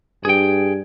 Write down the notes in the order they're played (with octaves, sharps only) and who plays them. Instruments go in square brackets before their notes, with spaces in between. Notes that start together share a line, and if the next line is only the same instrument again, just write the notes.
[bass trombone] G2 [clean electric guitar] G#4 G5